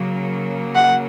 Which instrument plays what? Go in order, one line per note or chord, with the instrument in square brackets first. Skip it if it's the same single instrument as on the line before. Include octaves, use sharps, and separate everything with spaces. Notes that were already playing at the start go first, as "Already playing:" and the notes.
Already playing: [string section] C#3 F#3 A#3
[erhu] F#5